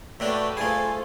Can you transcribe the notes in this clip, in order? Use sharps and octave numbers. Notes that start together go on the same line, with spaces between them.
A2 A3 D4 F#4 B4 D5 G5 E6
A3 F4 G#4 A4 C5 G#5